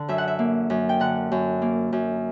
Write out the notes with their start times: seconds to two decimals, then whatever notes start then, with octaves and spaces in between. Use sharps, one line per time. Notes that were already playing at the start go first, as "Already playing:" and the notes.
Already playing: D3
0.08 F#2 E5
0.18 F#5
0.28 E5
0.39 A#3
0.70 F#2
0.89 G5
1.00 D3 F#5
1.32 F#2
1.62 A#3
1.93 F#2